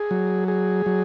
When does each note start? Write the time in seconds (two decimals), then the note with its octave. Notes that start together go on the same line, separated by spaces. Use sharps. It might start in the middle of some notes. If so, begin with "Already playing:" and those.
Already playing: G#4
0.11 F#3
0.48 G#4
0.86 F#3